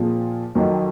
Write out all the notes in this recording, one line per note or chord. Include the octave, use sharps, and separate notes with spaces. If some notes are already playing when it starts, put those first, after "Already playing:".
Already playing: A#2 F3 C4 F4 G#4
F2 D#3 F#3